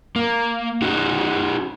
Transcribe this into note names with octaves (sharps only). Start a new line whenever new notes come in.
A#3
C#4 D#4 F#4